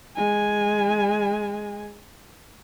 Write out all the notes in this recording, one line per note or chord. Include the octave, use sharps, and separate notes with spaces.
G#3 G#5